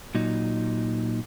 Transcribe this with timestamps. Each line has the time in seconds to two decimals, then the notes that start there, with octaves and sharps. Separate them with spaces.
0.15 A#2 F#3 D#4